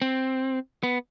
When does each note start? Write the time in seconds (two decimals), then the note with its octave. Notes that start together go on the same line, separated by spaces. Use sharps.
0.02 C4
0.83 B3